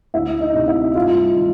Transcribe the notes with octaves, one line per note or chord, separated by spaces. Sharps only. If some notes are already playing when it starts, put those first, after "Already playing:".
D2 E4 E5
D#4 D#5
C3
E4 E5
G2 F4 F5
D#3